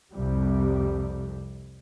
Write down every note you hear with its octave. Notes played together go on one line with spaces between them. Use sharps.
C2 F2 C3 G3